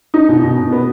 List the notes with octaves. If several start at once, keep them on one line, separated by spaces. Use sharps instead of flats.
D#4
B2
B2
B2
B3